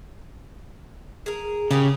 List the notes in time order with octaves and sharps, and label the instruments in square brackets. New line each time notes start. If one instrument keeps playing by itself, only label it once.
[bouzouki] G#4 A#4
[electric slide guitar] C#3 [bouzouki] G4 G#4 A#4